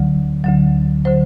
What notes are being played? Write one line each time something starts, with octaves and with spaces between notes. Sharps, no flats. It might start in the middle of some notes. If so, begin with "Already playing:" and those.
Already playing: D2 D3 F#3
D2 D3 F#3
D3 F#3 C5